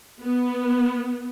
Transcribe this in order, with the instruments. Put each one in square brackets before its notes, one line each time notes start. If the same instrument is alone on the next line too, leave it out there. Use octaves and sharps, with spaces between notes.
[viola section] B3